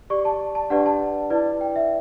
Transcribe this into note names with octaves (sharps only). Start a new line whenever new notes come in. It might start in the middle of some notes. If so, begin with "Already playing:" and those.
G4 D5 C#6
A5
A5
D4 G4 B4 D5 F#5
A5
E4 B4 D5
G5
E5